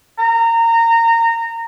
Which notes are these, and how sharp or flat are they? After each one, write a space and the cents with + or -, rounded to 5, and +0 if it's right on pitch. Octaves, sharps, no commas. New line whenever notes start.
A#5 -25